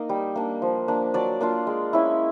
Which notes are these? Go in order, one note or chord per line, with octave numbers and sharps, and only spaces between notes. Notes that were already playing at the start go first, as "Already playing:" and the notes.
Already playing: A#3 D#4
G3
A#3 D4
F3
A#3 D4
F#3 D5
A#3 D4 F4
G#3
C#4 E4